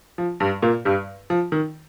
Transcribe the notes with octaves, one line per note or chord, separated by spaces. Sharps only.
F3
G2 G3
A#2 A#3
G2 G3
F3
D#3